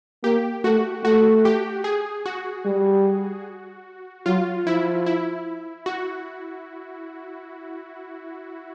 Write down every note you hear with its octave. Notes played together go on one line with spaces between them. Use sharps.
A#3 G4
A3 F#4
A3 F#4
G4
G#4
F#4
G3
F#3 F4
F3 E4
E4
F#4